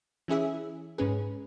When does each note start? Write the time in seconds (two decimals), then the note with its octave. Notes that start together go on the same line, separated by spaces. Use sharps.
0.28 E3 C#4 E4 G#4 E5
0.98 G#2 G#3 C#4 G#4 B4